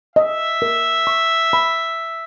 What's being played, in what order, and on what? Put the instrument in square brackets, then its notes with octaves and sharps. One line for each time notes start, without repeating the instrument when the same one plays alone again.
[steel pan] D#5 [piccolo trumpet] E5
[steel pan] A#4
C#6
B5